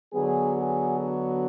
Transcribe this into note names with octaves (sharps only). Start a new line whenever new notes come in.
D3 F#3 B3 G#4
G#4
F#4